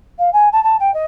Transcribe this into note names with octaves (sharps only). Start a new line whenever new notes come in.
F5
G#5
A5
A5
G5
D#5